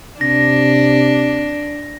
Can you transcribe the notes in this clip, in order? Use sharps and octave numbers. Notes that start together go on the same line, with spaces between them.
C3 D4 A#6